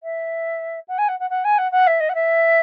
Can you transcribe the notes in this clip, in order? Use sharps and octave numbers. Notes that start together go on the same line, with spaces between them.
E5
F#5
G#5
F#5
F#5
F#5
G#5
F#5
F#5
E5
D#5
F#5
E5